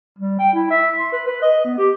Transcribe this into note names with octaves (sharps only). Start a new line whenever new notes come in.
G3
G5
E4
E5
C6
B4
B4
D#5
B3
G4